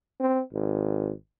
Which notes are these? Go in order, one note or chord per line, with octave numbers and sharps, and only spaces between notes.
C4
G#1